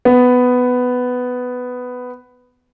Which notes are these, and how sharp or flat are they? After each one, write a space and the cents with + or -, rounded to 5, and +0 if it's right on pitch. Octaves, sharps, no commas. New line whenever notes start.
B3 +10